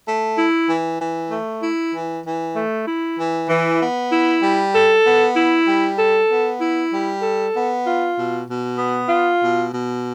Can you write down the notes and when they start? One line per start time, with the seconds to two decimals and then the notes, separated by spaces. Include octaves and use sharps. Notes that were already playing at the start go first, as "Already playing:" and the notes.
0.07 A3
0.37 E4
0.68 E3
1.00 E3
1.31 A3
1.62 E4
1.93 E3
2.24 E3
2.55 A3
2.87 E4
3.18 E3
3.48 E3
3.80 B3
4.11 E4
4.42 G3
4.74 A4
5.04 B3
5.36 E4
5.67 G3
5.98 A4
6.29 B3
6.60 E4
6.92 G3
7.22 A4
7.53 B3
7.85 F4
8.16 B2
8.48 B2
8.78 B3
9.09 F4
9.41 B2
9.71 B2